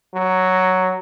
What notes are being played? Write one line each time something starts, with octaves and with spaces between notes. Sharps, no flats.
F#3